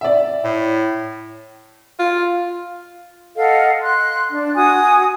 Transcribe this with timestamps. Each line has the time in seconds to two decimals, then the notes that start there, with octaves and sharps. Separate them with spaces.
0.01 D5 E5
0.44 A2
1.99 F4
3.36 A4 D#5 F5 F#5
3.82 C6 F#6
4.30 D4
4.56 F#4 G#5 D#6